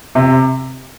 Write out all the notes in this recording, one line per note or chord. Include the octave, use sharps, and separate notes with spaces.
C3